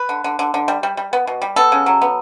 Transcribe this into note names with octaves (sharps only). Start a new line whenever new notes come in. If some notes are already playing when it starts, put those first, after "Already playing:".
Already playing: B4
D3
D3
D3
D3
G3
G3
G3
B3
B2
G3
B3 A4
C#3
F#3
B3